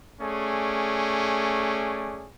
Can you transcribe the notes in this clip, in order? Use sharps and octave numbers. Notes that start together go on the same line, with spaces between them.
A3 C#4 G#4 D5